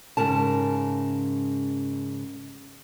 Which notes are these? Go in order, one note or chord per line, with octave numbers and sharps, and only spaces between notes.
G#2 C#3 A#4 A5